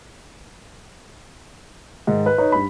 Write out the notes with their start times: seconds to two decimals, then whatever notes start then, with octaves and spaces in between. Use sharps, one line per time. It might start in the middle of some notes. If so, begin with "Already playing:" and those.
2.07 G#2 D#3
2.26 B4
2.38 D#4 B4 C#5
2.52 G2 B5